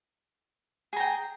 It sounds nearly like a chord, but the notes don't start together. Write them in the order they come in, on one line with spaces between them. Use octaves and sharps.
G#4 A#5 G5